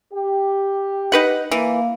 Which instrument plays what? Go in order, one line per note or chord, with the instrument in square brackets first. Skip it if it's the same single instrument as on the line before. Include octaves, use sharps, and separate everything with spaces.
[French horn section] G4
[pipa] D#4 B4 F#5
[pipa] E3 [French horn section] A#3